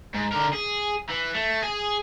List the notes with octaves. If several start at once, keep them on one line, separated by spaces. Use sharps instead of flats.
G#2
D3 A#4
G#4
E3
A3
G#4